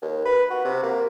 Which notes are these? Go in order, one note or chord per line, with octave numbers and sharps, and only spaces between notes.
D#2
B4
F#4
C3
A#3